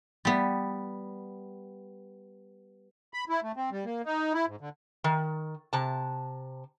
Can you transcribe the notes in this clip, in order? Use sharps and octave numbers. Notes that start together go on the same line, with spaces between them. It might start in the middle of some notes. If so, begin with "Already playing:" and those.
G3 B3
B5
E4
A3
C4
G3
A#3
D#4
E4
G#2
D3
D#3
C3 A5